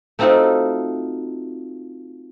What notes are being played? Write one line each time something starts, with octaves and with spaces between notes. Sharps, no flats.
A3 C4 D#4 F4 F#4 A4